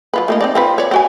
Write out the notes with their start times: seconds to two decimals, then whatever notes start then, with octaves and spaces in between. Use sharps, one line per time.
0.14 F#3 F4 B4
0.28 A3 A#3 D#4
0.41 C4 D#4 D5
0.55 C4 F4 B4
0.78 C#5 D5
0.91 C4 F#4 G#5